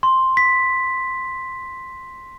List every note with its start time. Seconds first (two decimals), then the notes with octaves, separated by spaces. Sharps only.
0.03 C6
0.37 B6